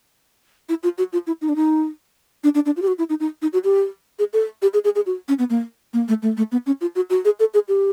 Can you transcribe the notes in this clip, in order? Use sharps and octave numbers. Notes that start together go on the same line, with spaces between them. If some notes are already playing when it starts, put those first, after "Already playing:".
E4
F4
F#4
F4
E4
D#4
D4
D#4
D4
D4
D4
F4
G4
F#4
E4
D#4
D#4
D#4
F#4
G4
G#4
A4
G4
G#4
G#4
G#4
F#4
C#4
B3
A#3
A#3
A3
A3
A3
B3
C#4
F4
F#4
F#4
G#4
A4
G#4
G4